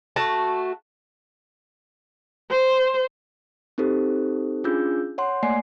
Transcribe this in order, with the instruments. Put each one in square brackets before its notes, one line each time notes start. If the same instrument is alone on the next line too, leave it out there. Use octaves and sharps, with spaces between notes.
[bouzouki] A3 F#4 A5
[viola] C5
[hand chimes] C4 D#4 G4 A4 C5
C#4 D4 F4 G#4 E6 G6
C#5 F#5 C6
A3 A#3 D5 G#5 C7